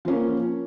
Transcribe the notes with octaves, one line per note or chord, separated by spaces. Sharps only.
F3 A#3 C#4